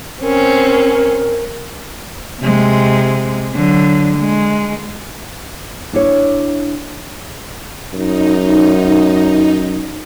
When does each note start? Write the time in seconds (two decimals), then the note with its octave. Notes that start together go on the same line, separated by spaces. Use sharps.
0.23 C4 C#4 A#4
2.41 C3 G#3
3.55 D3 F#3
4.18 G#3
5.93 D4 E4 C#5
7.93 F#2 D#4